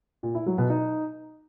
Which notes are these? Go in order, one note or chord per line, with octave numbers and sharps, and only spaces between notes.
A#2
E4
F#3
B2
D#4